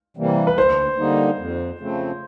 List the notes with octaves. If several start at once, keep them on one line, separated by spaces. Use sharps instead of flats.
C3 E3 G3 A#3
B4
D2 C5
D3 G3 A#3 D#4
F2
C#3 F3 A3 C4